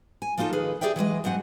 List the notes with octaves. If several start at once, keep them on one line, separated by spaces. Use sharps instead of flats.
G#5
F3 A#3 D#4 F4 A4
D#3 G#4 B4
G4 G#4 B4 D5 E5 G5
E3 F#3 G#3 D#5
G2 F#3 C4 F#5 G#5